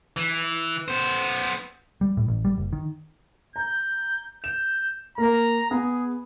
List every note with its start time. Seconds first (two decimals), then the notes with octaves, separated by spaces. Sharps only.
0.17 E3
0.88 B3 C5
2.01 G3
2.17 A2
2.28 A1
2.45 G3
2.58 F#1
2.73 D#3
3.56 A#5 G6
4.44 G6 E7
5.18 A#3 A#4 A#5
5.71 B3 G#4